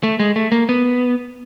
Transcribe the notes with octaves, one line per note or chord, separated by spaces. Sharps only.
A3
G#3
A3
A#3
B3